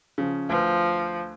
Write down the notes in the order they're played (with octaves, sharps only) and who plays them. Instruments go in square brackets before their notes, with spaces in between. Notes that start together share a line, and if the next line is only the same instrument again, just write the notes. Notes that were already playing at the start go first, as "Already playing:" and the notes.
[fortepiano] C#3 F3
[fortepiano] D2 B4 [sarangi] F3